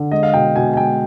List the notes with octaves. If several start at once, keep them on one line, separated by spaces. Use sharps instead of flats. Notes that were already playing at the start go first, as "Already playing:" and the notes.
Already playing: D3
G#3 D#5
F5
B2 G5
B2 G#5
G#5
G#3 G5